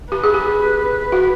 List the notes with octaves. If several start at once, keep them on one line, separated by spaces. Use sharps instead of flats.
G4 B4
G#4
G4
F#4